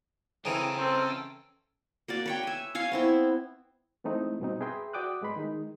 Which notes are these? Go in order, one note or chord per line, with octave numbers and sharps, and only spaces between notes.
C#3 E3 C4 A4 G5 A#5
C4 C#4 A4
A#3 F#4 D5
B4 C#5 G5
E5 G#5
C#5 F5 G#5
B3 C4 E4
E3 G#3 A3 C4 D#4 E4
G2 B2 C4 D#4
G#4 B4 E5 G5 A#5 C6
F#4 D5 G5 D6 D#6 F#6
G#2 G#3 B4 B5 C6
D#3 G#3 D#4